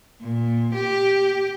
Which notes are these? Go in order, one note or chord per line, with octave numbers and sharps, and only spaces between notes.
A#2
G4